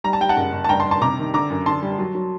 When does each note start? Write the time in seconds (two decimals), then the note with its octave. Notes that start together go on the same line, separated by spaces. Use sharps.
0.04 G3 A#5
0.13 A5
0.21 G3 G5
0.29 F#5 A5
0.37 F#1
0.53 F#1
0.64 A5
0.69 G2 G5 A#5
0.80 A5 C6
0.85 G2
0.91 A5 C6
1.02 C3 A#5 D6
1.18 D#3
1.34 D3 A#5 D6
1.50 F#2
1.66 D3 A5 C6
1.82 G3
1.99 F#3
2.15 F#3